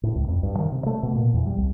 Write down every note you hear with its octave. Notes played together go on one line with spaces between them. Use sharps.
A2
C#2
F2
G2
D#3
C3
A3
B2
A#2
E2
G3
C2